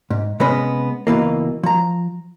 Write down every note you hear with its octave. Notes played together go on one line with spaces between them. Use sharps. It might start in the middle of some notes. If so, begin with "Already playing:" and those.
G#2
C3 G#3 B3 C#4 B4 D#5
C#2 B2 E3 A#3
F3 A#5